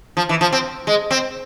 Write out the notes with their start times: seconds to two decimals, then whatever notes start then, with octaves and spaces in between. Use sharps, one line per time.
0.17 F3
0.29 E3
0.41 F3
0.52 C4
0.87 G#3
1.11 C4